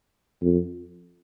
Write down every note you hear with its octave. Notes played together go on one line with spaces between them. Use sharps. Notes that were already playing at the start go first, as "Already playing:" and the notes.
F2